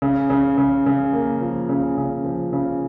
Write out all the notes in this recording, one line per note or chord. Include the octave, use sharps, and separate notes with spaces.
C#3
C#3
C#3
C#3
A#3
F3
C#3
C#3
F3
C#3